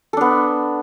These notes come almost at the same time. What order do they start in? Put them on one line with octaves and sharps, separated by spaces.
A4 D4 B3